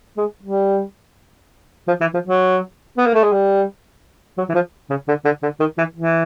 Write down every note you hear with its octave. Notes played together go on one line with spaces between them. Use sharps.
G#3
G3
F3
E3
F3
F#3
B3
A#3
A3
G#3
G3
F#3
E3
F3
C#3
D3
D3
D3
D#3
E3
E3